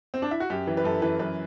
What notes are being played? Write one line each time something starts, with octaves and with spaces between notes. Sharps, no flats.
C4
D4
E4
F#4
F#2 G4
E3
B4
F#2 A4
E3 B4
F#2 B4